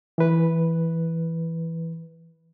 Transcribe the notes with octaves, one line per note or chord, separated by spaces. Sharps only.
E3 B4